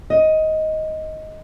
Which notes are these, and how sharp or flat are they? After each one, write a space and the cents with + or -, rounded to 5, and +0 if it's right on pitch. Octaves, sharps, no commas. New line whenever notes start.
D#5 +10